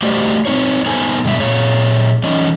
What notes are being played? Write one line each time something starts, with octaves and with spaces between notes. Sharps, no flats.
A3 F#4 G4 C5 D5 D#5
C4 D#4 C#5
B3 D#4 A4 C5 G#5
G2 B2 D3 G#3 G4 E5
A#2 G#4 C#5
E3 C#4 D#4 D#5